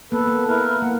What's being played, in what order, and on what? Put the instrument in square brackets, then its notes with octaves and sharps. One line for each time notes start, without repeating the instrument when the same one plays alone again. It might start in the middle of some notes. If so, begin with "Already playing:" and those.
[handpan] A#3 B3 [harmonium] A4 B4
[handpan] A#3
[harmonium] E4 A#4 B4
[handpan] A#3 [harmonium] F#5